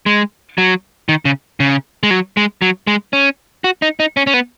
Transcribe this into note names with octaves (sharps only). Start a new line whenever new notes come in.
G#3
F#3
D#3
C#3
C#3
G#3
F#3
G#3
F#3
G#3
C#4
F#4
D#4
D#4
C#4
C#4
B3